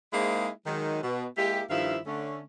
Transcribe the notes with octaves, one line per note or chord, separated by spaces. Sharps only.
G#3 A#3 C4 D#4 E4 G#4
D#3 F#3 G#3
B2
G#3 A#3 E4 G4
G2 D#3 F3 E4 E5 F5
D3 A3 C#4